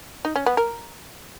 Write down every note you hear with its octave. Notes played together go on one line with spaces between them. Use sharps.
D#4
C#4
B3
A#4